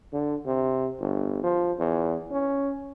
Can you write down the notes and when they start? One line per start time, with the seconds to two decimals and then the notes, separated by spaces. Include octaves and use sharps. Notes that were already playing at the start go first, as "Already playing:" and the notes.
0.13 D3
0.46 C3
0.99 G1
1.43 F3
1.79 E2
2.31 C#4